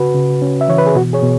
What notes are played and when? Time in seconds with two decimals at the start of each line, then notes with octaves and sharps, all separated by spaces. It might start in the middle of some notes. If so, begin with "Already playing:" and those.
Already playing: C#3 F#4 B4
0.14 C#3
0.42 C#4
0.61 E5
0.68 E3 C#5
0.78 B4
0.87 G#4
0.95 B2 F#4
1.13 G#4 C#5
1.23 B2